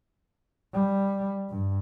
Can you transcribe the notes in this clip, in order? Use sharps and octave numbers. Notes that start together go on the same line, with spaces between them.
G3
G2